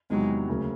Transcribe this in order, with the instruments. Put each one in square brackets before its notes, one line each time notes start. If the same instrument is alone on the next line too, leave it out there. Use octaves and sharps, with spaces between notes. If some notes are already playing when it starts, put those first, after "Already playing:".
[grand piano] E2 C3 D#3 F#3 [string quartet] G#3
[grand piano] D2 C#3 F#3 A#3